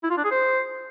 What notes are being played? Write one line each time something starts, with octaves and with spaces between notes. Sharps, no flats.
E4
F4
D4
G#4
C5